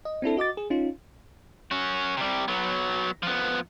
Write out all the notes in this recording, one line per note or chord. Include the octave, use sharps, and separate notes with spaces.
D#5
C4 D4 E4 A4
F#4 D#5 D6 A6
G#4
C#4 D#4 F4
C#4 F#4
C3 G3
F#3 B3
F3 B3